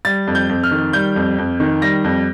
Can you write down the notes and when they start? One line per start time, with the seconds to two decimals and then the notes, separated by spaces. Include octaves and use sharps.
0.05 G3 A6
0.27 F2
0.35 G6
0.49 F2
0.63 F6
0.71 D#3
0.93 G3 G6
1.16 F2
1.38 F2
1.60 D#3
1.82 G3 A#6
2.04 F2